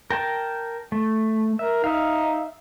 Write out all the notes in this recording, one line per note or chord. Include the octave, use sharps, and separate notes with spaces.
A#4 G5 A5
A3
A#4 E5
D#4 E5 F5